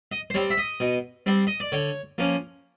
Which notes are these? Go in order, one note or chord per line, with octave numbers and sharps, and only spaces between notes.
D#5
C5
G3 C4 C#5
E5
D#5
B2
G3 C4
D#5
D5
D3 C#5
F3 A#3 C#4